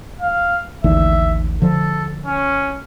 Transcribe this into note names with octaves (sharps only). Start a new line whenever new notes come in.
F5
A1 D#2 D3 E5
D3 F3 A4
C#4